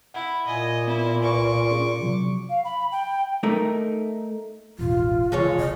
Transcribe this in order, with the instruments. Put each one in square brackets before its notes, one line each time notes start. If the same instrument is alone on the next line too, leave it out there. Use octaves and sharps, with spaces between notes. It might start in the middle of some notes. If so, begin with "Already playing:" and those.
[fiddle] E4 [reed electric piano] F#5
[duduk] A#2 [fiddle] D#5 G#5
[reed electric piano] B3 [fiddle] E4
[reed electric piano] C2 B4 G#5 [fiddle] C#6 D6
[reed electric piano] C#4 G#4
C3 F3 F#3
[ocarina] F5
B5
G5
[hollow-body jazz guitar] A3 D#4 A#4
[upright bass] E1 A1 [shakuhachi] F4
[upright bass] C#3 E3 [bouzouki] G#3 A4 C#5
[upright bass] C#3 [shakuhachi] D#5